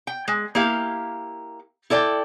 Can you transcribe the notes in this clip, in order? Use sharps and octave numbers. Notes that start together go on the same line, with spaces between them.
G5
G#3
A#3 E4 G4 F5
E4 A4 D5 G5